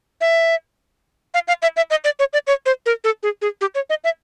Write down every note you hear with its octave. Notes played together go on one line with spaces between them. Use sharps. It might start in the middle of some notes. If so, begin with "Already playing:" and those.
E5
F5
F5
E5
E5
D#5
D5
C#5
D5
C#5
C5
A#4
A4
G#4
G#4
G4
C#5
D#5
E5